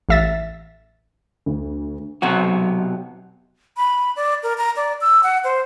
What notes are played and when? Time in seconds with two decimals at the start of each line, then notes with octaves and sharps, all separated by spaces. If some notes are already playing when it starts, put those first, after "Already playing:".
0.09 A1 E5 A6
1.46 D2
2.22 B1 C3 F#3 F#4
3.77 B5
4.16 D5
4.43 A#4
4.58 A#5
4.76 D5
5.01 E6
5.23 F#5
5.44 C5